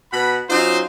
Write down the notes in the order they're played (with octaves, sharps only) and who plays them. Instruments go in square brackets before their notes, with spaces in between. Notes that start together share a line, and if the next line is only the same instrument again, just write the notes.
[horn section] B2 B4 F#5 B5
F#3 C#4 D#4 F4 C5